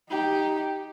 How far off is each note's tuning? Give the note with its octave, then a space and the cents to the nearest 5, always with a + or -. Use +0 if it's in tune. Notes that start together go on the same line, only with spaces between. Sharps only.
D#4 +0 G4 +0